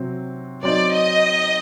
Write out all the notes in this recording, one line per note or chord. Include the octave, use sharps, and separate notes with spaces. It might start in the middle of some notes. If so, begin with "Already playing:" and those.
Already playing: C3 F#3 C4
F#3 C4 D#4 D5
D#5